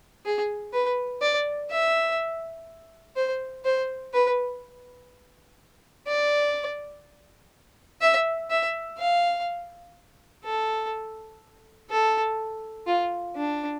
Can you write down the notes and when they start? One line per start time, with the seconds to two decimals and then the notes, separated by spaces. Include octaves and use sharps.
0.25 G#4
0.73 B4
1.22 D5
1.71 E5
3.16 C5
3.65 C5
4.13 B4
6.08 D5
8.01 E5
8.50 E5
8.98 F5
10.44 A4
11.90 A4
12.87 F4
13.36 D4